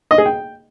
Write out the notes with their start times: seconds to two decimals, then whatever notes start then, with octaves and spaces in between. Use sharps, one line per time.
0.11 D#5
0.18 G#4
0.25 G5